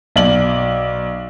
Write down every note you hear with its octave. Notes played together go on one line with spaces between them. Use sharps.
B1 D5 F#7